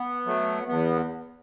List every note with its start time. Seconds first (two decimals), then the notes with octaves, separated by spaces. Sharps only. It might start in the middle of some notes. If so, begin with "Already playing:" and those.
Already playing: B3
0.26 F#3 A3
0.68 E2 B3